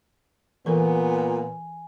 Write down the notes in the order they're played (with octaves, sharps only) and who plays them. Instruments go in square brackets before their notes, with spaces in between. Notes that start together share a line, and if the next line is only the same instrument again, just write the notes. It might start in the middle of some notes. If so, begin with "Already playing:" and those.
[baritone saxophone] A#2 [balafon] E3 A4 A#4 [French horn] B3 [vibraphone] G#5